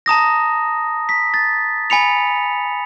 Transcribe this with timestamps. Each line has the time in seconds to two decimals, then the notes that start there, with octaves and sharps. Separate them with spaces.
0.06 A5 A#5 D#6 A#6
1.09 B6
1.34 A6
1.90 G#5 B5 C#7 F7